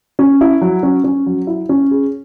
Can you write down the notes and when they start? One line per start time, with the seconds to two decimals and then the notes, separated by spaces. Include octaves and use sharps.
0.19 C#4
0.41 E4
0.61 F#3
0.83 C#4
1.04 C#4
1.26 F#3
1.47 E4
1.69 C#4
1.91 G#4